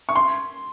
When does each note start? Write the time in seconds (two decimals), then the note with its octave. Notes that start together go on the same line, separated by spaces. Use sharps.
0.09 C#6
0.16 C6